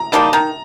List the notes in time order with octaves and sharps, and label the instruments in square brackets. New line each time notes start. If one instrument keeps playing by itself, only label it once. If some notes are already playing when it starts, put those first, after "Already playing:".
Already playing: [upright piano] A#5
[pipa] G3 A#3 D#4 [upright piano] A5
[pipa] D#3 [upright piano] A#5